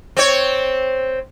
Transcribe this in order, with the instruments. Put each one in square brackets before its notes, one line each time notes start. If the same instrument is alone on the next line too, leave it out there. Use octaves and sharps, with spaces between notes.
[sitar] C4 C#5